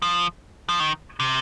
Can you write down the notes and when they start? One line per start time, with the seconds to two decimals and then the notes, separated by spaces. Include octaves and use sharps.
0.02 F3
0.69 F3
0.80 D#3
1.20 C3